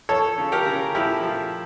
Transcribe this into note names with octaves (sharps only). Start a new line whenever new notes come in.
F3 A4 C#5
C#3
G4 A#4
C#3
F3 E4 G4
F3